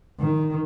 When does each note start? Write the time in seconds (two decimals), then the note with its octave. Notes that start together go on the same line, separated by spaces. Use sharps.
0.20 D#3